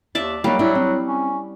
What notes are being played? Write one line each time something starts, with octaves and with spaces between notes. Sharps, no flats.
D#2 D5 E5 A5
F#3 G3 A#3 C#4 D#4
F#3 D4 E4
C4
C#4